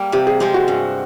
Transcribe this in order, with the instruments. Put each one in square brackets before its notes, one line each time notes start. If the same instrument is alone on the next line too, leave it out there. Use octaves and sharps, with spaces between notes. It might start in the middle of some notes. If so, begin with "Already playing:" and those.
Already playing: [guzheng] G3 A#3
[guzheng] C3 [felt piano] G4
[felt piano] G#4
[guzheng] F3 G#3 C4 [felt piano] G4
[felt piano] F#4
[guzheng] G2